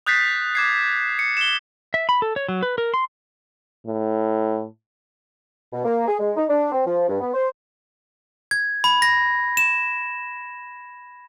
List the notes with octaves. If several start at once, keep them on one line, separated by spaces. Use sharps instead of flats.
D#6 F#6 G6 A6 B6 C7
D6 G#6 C7
C#7
E7 G7
E5
B5
A4
C#5
F#3
B4
A#4
C6
A2
B2
A#3
G#4
G#3
D#4
D4
C4
F3
G2
B3
C5
G#6
B5
A#6
E7